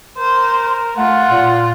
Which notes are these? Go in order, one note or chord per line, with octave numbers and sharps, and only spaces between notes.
A#4 C5
A3 F4 F#5
A#2